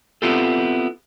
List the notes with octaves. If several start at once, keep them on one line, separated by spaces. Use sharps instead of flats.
B3 C4 E4 F4 G4 A4